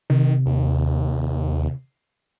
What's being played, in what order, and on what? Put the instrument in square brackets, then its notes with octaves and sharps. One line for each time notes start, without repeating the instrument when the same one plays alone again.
[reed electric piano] C3 [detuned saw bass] D#3
[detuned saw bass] D#2